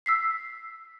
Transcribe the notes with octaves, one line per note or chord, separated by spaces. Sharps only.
E6 B6 C7